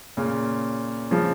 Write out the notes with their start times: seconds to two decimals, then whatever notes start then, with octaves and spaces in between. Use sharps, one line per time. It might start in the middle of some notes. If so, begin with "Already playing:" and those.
0.17 A#2 C#3
1.11 C#3 F3